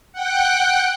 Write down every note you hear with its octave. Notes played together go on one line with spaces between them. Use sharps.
F#5 G5 F#6